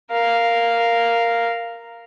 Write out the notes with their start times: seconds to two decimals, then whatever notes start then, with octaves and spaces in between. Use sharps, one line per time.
0.11 A#4 F5